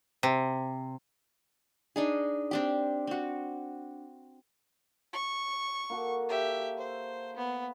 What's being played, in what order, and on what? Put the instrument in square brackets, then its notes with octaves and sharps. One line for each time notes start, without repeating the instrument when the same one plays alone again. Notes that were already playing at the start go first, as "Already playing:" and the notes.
[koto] C3
[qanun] D4 D#4 G#4
C4 D4 G4
C4 F#4
[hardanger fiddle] C#6
[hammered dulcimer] A#3 F#4 A4
[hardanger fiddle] G4 E5
C5
B3